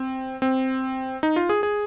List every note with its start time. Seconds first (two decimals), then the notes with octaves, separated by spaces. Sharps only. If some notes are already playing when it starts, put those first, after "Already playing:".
Already playing: C4
0.42 C4
1.23 D#4
1.36 F4
1.49 G#4
1.63 G#4